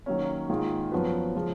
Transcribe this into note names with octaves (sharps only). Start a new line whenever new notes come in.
D#3 F#3 A#3 C#4
G#2 D#3 A#3 F4 G#4
F#2 F3 B3 F#4 B4
C#3 F3 G#3